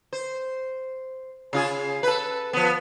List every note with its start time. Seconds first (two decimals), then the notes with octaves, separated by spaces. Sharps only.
0.13 C5
1.53 C#3 F4 G#4
2.03 A4 B4
2.53 F3 B3